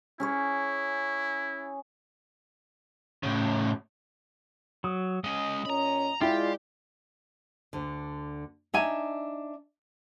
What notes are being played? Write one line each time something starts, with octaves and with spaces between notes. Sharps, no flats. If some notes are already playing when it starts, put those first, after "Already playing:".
C#4 E4 G#4 C#5
A2 C#3
F#3 D#6
G#3 C#4 D#5
A#2 C#4 A#5 B5
G#3 E4 F4 G4 D5 G5
D2 D3
D4 D#4 D#5 E5 G#5 A#5